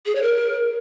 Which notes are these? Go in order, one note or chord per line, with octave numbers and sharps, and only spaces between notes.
G#4
C#5
A#4